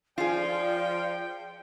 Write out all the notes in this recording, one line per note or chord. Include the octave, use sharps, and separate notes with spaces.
F3 F4 G#4 D5 G5